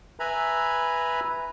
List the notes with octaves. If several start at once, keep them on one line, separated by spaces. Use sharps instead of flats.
B4 E5 G#5 A#5 B5